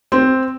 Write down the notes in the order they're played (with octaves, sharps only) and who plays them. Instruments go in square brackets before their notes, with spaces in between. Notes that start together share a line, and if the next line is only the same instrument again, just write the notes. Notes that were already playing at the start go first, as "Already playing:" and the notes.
[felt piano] C4